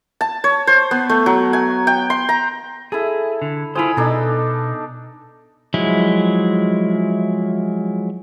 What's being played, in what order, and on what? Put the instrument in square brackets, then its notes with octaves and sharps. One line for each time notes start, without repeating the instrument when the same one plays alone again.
[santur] A5
C#5
C5
B3
A3
F#3
G#5
G5
C6
A#5
[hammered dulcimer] E4 A4 [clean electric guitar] G#4
[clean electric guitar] D3
[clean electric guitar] E4 F4 C5 [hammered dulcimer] G#4 B5
[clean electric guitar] B2 [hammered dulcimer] D4 D#4 A4
[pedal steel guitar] F3 F#3 G#3 E4